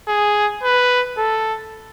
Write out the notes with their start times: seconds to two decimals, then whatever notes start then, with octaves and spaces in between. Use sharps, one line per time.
0.08 G#4
0.63 B4
1.18 A4